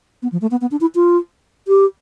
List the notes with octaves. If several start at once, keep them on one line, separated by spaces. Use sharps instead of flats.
B3
F3
A3
B3
B3
D4
E4
F4
G4